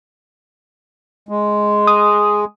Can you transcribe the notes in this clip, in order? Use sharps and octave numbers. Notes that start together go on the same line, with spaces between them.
G#3
D#6